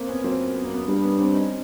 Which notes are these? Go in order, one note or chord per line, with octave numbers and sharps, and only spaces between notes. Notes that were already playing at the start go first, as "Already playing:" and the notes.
Already playing: A#3 C4
B3 C#4
F#2 A#3 C4
B3
A#3
B3
G2 B3
B3 C#4
C4 D4
C#4 D#4